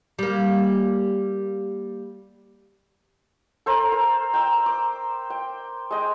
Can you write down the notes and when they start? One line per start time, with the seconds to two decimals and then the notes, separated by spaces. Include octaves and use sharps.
0.19 G3 A#3
3.66 A4 C5 A#5
3.92 A#4
4.34 G5 A#5 E6
4.66 D6
5.30 G5
5.91 G#3 D#5 G5